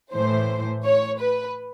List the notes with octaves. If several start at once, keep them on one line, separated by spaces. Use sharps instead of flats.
A2 E3 C5
C#5
B4